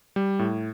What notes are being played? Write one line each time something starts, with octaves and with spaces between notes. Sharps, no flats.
G3
A2